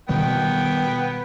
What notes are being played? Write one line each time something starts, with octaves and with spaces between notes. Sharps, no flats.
B2 D#3 G3 B3 G5